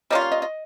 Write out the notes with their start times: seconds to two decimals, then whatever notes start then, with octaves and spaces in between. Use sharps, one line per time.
0.10 G3 A#3 C#4 F4 D#5
0.21 F5
0.32 D#5
0.42 D#5